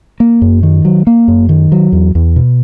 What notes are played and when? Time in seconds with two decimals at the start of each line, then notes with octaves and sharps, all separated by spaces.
0.20 A#3
0.42 F#2
0.63 D#3
0.85 F#3
1.07 A#3
1.28 F#2
1.49 D#3
1.72 F#3
1.92 E2
2.15 E2
2.36 B2